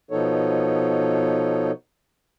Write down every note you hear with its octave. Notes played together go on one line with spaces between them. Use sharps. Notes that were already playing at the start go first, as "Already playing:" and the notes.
B2 F3 B3 D#4 A4 C#5